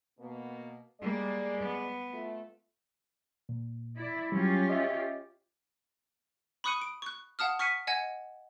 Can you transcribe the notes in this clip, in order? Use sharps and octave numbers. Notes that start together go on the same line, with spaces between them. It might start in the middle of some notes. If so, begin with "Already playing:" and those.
B2 A#3 B3
G3 G#3 A#3 D5
B3
A3 F4
A#2
E4 D5
F#3 G3 C#4 F4 G4
D#5 E5
B5 C#6 D#6 F#6 C#7 D#7
D7
C#6 F#6
F5 F#5 A5 D#6 F6
C#6 F6 B6 C#7 D#7
D#5 F#5 G#5 G#6